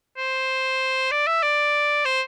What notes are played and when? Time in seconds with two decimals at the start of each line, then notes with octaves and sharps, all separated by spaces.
0.18 C5
1.11 D5
1.27 E5
1.43 D5
2.05 C5